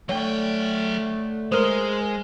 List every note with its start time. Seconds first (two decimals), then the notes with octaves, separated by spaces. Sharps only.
0.09 D3 F#3 A3 C#5 G5
1.52 G#3 A#4 C5 D#6 F6